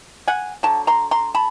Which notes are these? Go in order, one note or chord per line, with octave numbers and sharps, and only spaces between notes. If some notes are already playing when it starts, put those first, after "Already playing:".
F#5 G#5
D3 F#3 A5
A#5 C6
A#5 C6
A5 B5